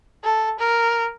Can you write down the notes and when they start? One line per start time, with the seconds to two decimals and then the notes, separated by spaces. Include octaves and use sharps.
0.24 A4
0.59 A#4